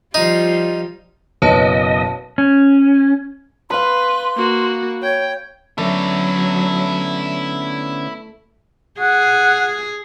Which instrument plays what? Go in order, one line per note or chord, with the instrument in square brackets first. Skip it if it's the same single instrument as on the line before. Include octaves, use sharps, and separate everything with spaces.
[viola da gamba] F3 G3 F4 [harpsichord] D#4
[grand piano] F#1 B2 [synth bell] B4 C#5 A5 [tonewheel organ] D#5
[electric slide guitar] C#4
[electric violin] B4 [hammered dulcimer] F5 B5 [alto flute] C6
[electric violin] A#3 F#4
[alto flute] C#5 [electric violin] G5
[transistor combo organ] D3 B3 C#4 [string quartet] F#3 [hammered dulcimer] A3 [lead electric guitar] E4 D5
[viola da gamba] G#4 [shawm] F#5